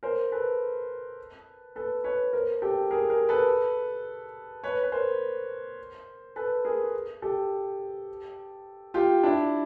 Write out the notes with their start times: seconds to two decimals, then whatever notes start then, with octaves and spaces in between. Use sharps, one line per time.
0.03 A#4 C5
0.32 A4 B4
1.76 A4 B4
2.04 B4 C#5
2.33 A#4 C5
2.62 G4 A4
2.91 G#4 A#4
3.10 G#4 A#4
3.29 A4 B4
4.64 B4 C#5
4.83 B4
4.92 A#4 C5
6.36 A4 B4
6.65 G#4 A#4
7.22 G4 A4
8.94 F4 G4
9.23 D4 E4